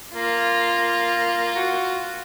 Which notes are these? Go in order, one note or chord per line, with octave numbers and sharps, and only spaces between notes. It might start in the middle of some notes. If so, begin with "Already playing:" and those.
A#3 F4
F#4